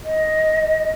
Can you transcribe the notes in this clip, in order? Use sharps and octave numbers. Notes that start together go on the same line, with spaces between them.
D#5